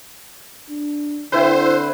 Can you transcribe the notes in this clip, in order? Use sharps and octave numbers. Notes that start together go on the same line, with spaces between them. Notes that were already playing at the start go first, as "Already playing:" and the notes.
D4
D3 C4 E4 B4 C5